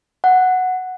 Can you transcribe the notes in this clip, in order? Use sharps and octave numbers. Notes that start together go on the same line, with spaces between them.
F#5